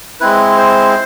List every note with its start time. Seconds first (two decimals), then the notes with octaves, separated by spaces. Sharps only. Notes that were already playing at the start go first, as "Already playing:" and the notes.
0.20 G#3 C4 E4 B4
0.58 C5